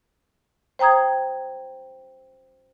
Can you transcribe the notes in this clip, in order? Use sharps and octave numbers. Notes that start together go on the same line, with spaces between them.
C5 G5 A#5 D#6 G#6